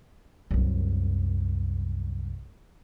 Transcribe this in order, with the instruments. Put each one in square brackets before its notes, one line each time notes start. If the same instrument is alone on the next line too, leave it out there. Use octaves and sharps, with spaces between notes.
[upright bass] C2 F#2